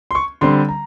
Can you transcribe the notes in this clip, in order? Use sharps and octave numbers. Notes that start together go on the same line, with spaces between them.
C6
C#6
D3 G3 C4 C6
A#5